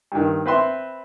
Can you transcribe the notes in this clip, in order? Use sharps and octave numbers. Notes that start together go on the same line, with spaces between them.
G2 D#3
C4 B4 E5 C6